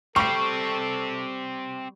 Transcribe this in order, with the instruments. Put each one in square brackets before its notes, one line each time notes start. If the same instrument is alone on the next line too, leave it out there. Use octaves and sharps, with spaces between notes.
[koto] G3 [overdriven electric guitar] C4 G4 [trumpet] A4 [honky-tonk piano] C#6 C7